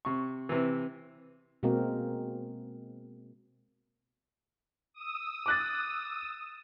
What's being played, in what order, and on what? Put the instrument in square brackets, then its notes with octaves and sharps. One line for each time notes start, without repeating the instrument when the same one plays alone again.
[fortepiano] C3 C#6
C3 E3
[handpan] B2 G#3 A#3 C4 F#4 A#4
[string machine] D#6 E6
[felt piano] D6 F#6 A6